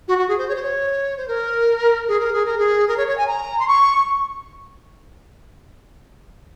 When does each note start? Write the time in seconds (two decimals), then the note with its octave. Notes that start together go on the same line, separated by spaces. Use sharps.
0.08 F#4
0.18 F#4
0.28 G#4
0.38 C5
0.48 C#5
0.55 C5
0.62 C#5
1.17 C5
1.27 A#4
2.08 G#4
2.20 A#4
2.33 G#4
2.45 A#4
2.58 G#4
2.87 A#4
2.97 C#5
3.07 C#5
3.17 G#5
3.27 A#5
3.59 C6
3.67 C#6